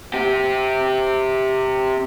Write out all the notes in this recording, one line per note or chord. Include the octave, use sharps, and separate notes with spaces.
C4 G4